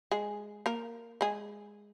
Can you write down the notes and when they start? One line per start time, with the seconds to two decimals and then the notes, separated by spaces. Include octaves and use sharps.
0.11 G#3 G#4
0.66 A#3 A#4
1.21 G#3 G#4